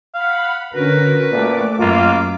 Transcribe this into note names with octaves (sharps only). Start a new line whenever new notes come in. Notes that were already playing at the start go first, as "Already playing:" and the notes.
F5 F#5 B5
D3 C#4 F#4 A#4 B4
A#2 A3 A4 D6
F#2 A#3 F4